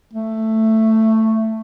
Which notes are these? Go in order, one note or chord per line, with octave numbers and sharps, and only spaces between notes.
A3